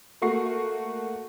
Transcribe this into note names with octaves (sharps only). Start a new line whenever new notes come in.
A3 A#3 F#4 C#6 C7